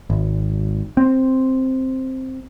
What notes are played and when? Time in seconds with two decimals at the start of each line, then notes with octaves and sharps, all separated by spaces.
0.10 G#1
0.97 C4